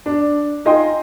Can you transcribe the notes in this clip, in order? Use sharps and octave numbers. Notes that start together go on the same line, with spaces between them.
D4
D#4 F4 D#5 G5 G#5 C6